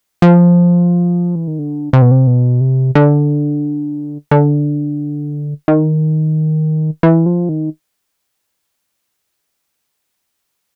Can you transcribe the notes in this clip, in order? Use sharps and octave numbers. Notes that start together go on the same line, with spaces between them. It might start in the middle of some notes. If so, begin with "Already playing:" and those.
F3
E3
D#3
D3
C3
B2
C3
B2
C3
D3
D3
D#3
E3
F3
D#3